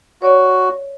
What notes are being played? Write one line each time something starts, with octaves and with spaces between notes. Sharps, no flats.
F#4 C#5 D5